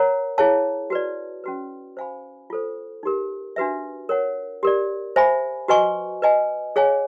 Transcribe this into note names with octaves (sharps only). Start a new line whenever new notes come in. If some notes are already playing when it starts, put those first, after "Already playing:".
Already playing: A#4 C#5 F#5 A#5
E4 G#4 C#5 F5 A5
F#4 B4 D5
C#4 F#4 B4
C5 F5 G#5 B5
F4 A4 C5
D#4 G4 A#4
D4 F#4 B4 E5
A#4 C#5 F#5
G4 A#4 D5
C5 E5 G#5 B5
F#4 B4 D#5 G#5 C#6
B4 D#5 G#5
G#4 C#5 F5 G#5